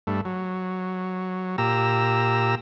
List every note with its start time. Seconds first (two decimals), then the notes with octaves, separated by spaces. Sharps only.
0.07 G2 A3
0.25 F#3
1.58 A#2 G4 A#5 E6